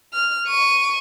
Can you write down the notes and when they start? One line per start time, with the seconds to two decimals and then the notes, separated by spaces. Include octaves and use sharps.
0.13 F6
0.48 C#6 D#7